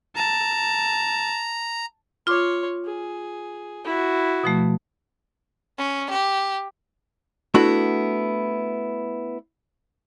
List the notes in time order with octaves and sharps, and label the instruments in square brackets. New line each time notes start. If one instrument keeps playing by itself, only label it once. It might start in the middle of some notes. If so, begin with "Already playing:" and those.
[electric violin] A5 [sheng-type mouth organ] A#5
[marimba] F4 D6 [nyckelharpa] C#5 C6
[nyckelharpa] G#4
E4 F#4
[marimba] B2 F3 A3
[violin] C#4
G4
[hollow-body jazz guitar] A3 B3 D4 E4 F#4